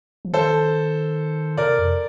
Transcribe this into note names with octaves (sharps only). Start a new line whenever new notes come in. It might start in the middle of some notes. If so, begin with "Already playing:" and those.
F3
D#3 A4 C5
C3 A#4 D5
F2